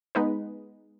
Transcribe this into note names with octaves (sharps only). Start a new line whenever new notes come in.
G#3 B3 D#4 B4